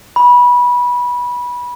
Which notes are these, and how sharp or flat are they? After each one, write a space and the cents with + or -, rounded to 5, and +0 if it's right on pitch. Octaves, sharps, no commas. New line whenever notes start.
B5 -20